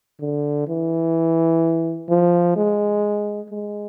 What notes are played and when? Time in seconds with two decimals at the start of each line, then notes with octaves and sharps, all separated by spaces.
0.20 D3
0.68 E3
2.09 F3
2.56 G#3
3.50 G#3